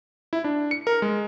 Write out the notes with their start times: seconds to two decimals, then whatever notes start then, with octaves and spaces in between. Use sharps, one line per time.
0.33 E4
0.44 D4
0.71 C#7
0.87 A#4
1.02 G#3